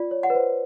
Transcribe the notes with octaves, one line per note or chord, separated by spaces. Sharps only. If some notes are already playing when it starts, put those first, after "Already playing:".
Already playing: F4 D5
C#5
F#5
B4
C5